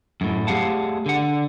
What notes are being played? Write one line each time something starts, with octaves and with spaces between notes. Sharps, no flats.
F#2 A2
A3 G4 G#4 F5 F#5 A5
D3 F#5